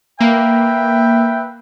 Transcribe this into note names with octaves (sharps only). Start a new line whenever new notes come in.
A#3 B4 E5 G5